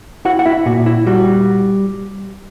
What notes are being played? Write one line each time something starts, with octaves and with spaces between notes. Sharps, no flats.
E4 F#4 F#5
F#5
E4 E5
A#2 F#4
E4
G3 F#4